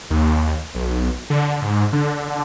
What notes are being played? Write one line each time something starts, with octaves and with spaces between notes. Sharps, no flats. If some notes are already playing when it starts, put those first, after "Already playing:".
D#2
B1
D3
G#2
D3